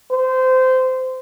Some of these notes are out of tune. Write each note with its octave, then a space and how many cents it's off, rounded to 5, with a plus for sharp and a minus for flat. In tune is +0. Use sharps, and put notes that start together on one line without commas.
C5 -20